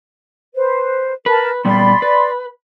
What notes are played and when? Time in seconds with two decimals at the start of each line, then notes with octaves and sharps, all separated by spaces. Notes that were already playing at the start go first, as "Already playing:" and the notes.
0.55 B4 C5
1.26 A#4 B4 A5
1.65 A#2 G3 B3 D5 B5 C6
2.02 B4